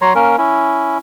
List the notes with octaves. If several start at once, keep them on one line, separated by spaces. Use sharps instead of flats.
F#3 C#5 A#5 C6
A#3 C#4 A#4
C#4 E4